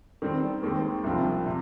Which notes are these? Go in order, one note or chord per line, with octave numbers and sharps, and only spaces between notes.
D#3 G3 C4
D#2 D#3 G#3 C4
C2 C3 F3 C4 F4
C3